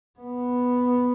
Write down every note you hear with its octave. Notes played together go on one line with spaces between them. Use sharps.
B3